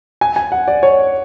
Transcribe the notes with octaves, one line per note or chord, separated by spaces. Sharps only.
G#5
G#5
F#5
D5
C#5